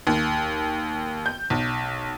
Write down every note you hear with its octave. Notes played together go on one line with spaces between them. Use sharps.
D#2
G6
B1